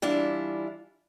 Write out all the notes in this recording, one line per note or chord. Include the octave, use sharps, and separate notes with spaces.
E3 G3 D4 E4 F4